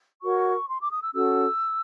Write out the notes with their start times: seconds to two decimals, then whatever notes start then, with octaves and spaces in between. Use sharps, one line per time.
0.22 F#4 A#4 C#5 C#6
0.68 C6
0.80 D6
0.91 D#6
1.02 E6
1.14 C#4 F#4 A4 E6